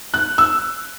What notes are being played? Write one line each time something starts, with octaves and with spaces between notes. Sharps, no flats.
F#6
E6